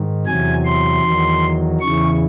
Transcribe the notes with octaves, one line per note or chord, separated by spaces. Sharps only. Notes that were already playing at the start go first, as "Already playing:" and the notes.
Already playing: G#2 D#3
E2 C3 F#3 G#5
C6
E2 D#3 F#3
E2 C#3 E3 C#6